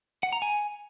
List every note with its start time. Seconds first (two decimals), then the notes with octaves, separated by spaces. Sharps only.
0.23 F#5
0.33 A#5
0.42 G#5